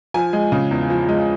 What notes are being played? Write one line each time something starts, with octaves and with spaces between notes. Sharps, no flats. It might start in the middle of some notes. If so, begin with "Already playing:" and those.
F3 G#5
G#3
C#3
E2
F3
G#3